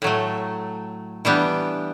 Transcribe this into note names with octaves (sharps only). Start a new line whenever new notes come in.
A2 F#3 A3
E3 G3 B3 D4 G4